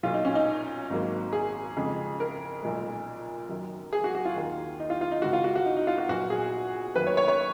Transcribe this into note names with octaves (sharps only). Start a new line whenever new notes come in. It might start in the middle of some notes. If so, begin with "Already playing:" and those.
B1 A#2 F#3 F4
D#4
C#4
D#4
G#1 G#2 F#3 A#3
G#4
F2 C#3 G#3
A#4
B1 A#2 G#3
F#2 D#3 F#3
G#4
F#4
F#4
F4
D#2 D#3 A#3
D#4
F4
F4
D#4
C#2 C#3 G#3 F#4
F4
F#4
F#4
D#4
D#4
F4
F#4
A#1 A#2 F#3 B3 F#4
G#4
F#2 D#3 A#3 B4
C#5
C#5
C#5